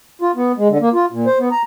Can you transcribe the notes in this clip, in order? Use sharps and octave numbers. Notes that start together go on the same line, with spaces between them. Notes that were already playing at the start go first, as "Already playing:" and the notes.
F4
B3
G#3
D3
A#3
F4
A#2
C5
B3
A#5